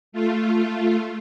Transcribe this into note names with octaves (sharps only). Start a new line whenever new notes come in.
A3 F4